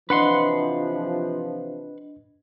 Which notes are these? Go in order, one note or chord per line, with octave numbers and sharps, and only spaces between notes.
C3 E3 F3 D4 B4 D#5 F#5 C6